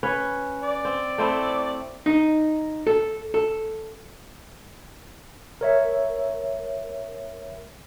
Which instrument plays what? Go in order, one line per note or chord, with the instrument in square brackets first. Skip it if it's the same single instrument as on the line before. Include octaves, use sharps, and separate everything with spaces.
[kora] C#4 B4 C#5
[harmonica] D5
[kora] C4
A3 C4 E4
[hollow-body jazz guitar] D#4
A4
A4
[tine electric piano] A#4 C#5 E5